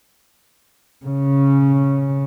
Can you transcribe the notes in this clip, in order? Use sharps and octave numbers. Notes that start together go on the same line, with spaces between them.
C#3 C#4